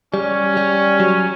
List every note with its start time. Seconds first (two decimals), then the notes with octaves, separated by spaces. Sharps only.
0.14 G3 C#4
0.57 G3
1.00 F#3